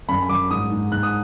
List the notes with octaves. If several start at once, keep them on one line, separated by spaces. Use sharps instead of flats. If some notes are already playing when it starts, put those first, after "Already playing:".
F#2 B5
B5
F#2 D6
G#2 D#6
G#2
G#2 F#6
D#6